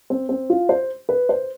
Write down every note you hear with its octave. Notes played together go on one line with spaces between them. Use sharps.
C4
C4
F4
C5
B4
C5